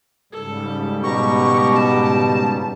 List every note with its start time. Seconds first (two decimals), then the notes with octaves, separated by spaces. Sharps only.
0.33 G#2 C#3 G3 A4
1.03 B2 G4 A#5 C#6
1.74 A5